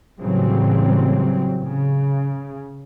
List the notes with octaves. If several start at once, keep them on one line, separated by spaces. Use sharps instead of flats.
A2 C#3 E3 F#3 G3 C4
C#3